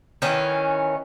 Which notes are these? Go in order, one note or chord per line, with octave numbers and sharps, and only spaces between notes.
D#3 E3 C#4